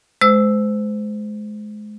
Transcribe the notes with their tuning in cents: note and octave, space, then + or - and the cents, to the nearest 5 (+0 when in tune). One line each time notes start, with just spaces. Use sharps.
G#3 +30 C5 -30 E6 +0